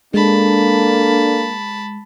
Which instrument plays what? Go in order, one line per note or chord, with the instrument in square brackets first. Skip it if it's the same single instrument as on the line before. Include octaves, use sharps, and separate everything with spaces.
[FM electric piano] G#3 [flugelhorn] A#3 [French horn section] D4 A4 [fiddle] A5 B5